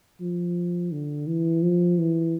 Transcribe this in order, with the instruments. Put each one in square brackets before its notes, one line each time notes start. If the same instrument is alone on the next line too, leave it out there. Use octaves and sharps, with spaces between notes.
[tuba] F3
D3
E3
F3
E3